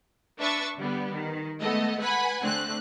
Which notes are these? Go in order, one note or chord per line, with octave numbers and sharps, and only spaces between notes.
D4 B4 E5 C#6 E6 A6
D3 G3 B3
D#3
G#3 A3 B3 A4 D#5
B4 F#5 G#5 B5
D3 A3 C4 F#6